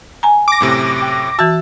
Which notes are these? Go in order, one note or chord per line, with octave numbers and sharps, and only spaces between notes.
G#5 A#5
D6 A#6
F#2 A2 C3
G5
E3 F#4 A5 E6 A6